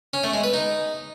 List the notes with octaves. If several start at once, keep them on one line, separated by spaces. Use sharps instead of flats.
C#4
A3
G#3
B4
D#4